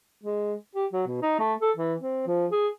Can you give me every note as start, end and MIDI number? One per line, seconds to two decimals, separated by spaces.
0.23 0.54 56
0.75 0.86 67
0.93 1.02 54
1.07 1.19 47
1.22 1.37 63
1.39 1.54 57
1.61 1.71 69
1.76 1.94 52
2.00 2.26 60
2.27 2.46 53
2.51 2.68 68